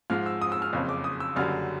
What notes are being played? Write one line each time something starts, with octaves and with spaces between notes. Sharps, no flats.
G#2 F3 G#3 F6
E6
D#6
E6
F6
F#1 F2 C#3
D6
D#6
E6
F#1 F#2 D3 G3 F6